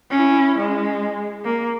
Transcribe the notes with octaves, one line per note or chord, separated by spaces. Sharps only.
C#4 E4
G#3
A#3